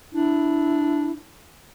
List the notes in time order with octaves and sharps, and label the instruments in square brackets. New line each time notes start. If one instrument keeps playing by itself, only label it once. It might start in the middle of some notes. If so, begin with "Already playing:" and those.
[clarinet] D4 [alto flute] E4